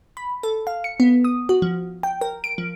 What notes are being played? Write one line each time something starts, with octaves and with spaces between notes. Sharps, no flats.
B5
A4
F5
C#7
B3
D#6
F#4
F3
G5
A#4
D7
F3